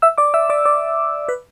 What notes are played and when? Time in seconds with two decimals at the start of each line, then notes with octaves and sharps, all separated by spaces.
0.02 E5 E6
0.18 D5 D6
0.34 E5 E6
0.50 D5 D6
0.65 D5 D6
1.29 B4 B5